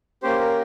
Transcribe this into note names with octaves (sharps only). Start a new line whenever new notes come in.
A#3 C#4 G4 C5
A#4